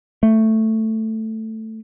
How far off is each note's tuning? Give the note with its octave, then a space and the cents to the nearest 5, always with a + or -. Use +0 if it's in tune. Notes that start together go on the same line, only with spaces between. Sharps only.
A3 +5